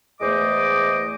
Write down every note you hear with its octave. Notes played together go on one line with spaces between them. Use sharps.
E2 G#3 A3 C5 D#5 D6